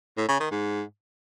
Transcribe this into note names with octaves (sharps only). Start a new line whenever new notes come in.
A2
C#3
D#3
G#2